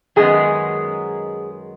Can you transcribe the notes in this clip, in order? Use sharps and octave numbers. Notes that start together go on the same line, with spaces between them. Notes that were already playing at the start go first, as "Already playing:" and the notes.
F#2 D#3 G#3 B3 G#4